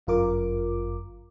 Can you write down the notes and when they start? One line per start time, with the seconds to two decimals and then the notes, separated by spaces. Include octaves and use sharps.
0.07 G1 F#2 F4 A#4 D6